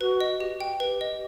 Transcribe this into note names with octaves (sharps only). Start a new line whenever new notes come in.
F#4 B4
D#5
G4
G5
G4 B4
D#5